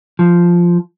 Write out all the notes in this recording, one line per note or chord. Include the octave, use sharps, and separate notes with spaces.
F3